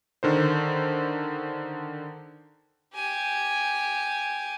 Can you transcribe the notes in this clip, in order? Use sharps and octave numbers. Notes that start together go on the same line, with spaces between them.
D3 D#3 C5
G4 G#5